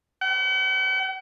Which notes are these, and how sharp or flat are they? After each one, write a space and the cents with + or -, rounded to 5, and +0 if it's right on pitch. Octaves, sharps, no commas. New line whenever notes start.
F#5 +45